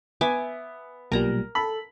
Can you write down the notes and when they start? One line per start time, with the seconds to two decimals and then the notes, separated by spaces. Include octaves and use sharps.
0.21 B3 E5 G#5 D6
1.12 B1 A#2 G3 A#4 A#5
1.55 A4 B5